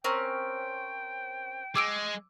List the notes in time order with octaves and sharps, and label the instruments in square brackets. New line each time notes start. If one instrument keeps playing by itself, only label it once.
[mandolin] C4 C#4 A#4 [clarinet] G5
[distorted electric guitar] G#3 [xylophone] D6 E6 D7